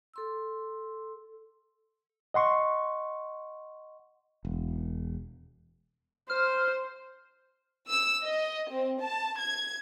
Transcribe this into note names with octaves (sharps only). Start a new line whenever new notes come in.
A4 C6 E6
D#5 F#5 C6 C#6
E1
C5 F6
E6
D#5
C4
A5
G#6